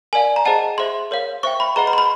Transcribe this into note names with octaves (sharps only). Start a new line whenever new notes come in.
A#4 D5 F5 G#5
A#5
G#4 C5 D#5 F#5 A5
G#4 C5 E5 C6
A#4 C#5 F5
C5 E5 G5 C#6
B5
G#4 B4 D#5 F#5 A#5
B5
C6
B5